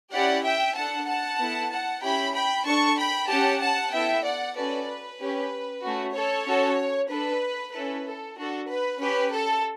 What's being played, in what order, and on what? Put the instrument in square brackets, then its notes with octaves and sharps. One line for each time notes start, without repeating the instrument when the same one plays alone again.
[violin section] C#4 E4 G4 D5 F#5
E5 G5
D4 A4 F#5 A5
F#5 A5
B3 E4 A4
F#5 A5
C#4 E4 G4 G5 B5
G5 B5
D4 A4 A5 C#6
G5 B5
C#4 G4 F#5 A5
F#5 A5
B3 E4 A4 E5 G5
D5 F#5
C#4 F#4 A4 B4 D5
B4
C#4 G4
A3 C#4 F#4
A4 C#5
C#4 F#4 A4
D4 A4 B4
C#4 E4 A4 B4
A4
D4 F#4 A4
B4
C#4 G4 B4
A4